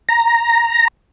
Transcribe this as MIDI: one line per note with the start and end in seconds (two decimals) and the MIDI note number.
0.09 0.88 82